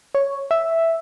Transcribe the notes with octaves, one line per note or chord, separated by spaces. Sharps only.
C#5
E5